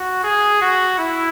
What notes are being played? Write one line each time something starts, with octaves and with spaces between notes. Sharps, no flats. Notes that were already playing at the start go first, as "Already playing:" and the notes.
Already playing: F#4
G#4
F#4
E4